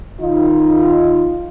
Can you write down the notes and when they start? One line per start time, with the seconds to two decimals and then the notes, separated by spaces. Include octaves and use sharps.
0.21 D#3 D#4 F4